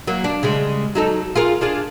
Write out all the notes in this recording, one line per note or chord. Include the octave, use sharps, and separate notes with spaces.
F#3 A#3
D4
C#3 G3 G#3
F#3 D#4 A4
F4 G#4 A#4
D4 F4 G#4